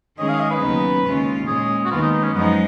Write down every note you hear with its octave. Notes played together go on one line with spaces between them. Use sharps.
D#3 G#3 C#4 G#4 D#5
F5
D#5
B4
D#2 C#3 F#3 B3 D#4
D#2 C#3 G#3 C#4 F4
A#2 G#3 C#4 G#4
F#4
D#2 D#3 G#3 B3 F4
D#4
D#4
C#4
F#2 F3 G#3 B3 D#4